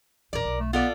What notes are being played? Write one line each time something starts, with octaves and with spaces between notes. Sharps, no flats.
A#1 E2 A#4 D5
B1
A3
B3 F4 A4 D5